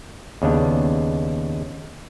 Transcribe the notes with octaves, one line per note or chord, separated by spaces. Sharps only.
D#2 C#3 B3 D4